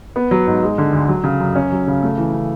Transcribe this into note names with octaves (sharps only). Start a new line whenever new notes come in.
B3
F#3
G#2
G#3
D3
D2
F#3
C#3
F#2
C#4
F#3
C#3
A3
E3
C#3